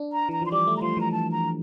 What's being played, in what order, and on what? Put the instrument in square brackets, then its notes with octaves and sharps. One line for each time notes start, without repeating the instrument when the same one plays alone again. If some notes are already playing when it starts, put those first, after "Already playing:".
Already playing: [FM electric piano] D4
[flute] A#5
[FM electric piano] E3 [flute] A#5
[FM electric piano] F3 [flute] C6
[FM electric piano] G3 [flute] D6
[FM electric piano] A3
[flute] A#5
[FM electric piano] F3 [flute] C6
[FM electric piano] E3 [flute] A#5
[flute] A5
A#5